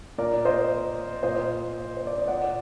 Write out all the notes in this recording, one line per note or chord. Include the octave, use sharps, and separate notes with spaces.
A#2 A#4 D5
C5 D#5
A#2 C5 D#5
C5
D5
D#5
A#2 D5 F#5